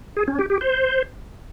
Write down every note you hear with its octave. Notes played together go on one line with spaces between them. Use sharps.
G#4
C#4
G4
G4
C5